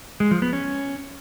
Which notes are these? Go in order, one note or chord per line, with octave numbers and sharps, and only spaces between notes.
G#3
F3
B3
C#4